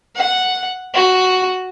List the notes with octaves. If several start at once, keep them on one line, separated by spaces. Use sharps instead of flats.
F#5
F#4